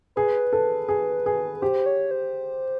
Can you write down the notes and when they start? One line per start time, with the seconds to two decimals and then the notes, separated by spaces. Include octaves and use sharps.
0.16 G#4 B4
0.53 A4
0.89 G#4
1.26 G#4
1.62 G4 C5
1.86 C#5
2.11 C5